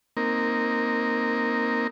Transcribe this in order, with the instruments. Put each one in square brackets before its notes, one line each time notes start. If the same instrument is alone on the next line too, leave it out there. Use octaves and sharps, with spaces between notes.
[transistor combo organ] A#3 C4 D#4 A#4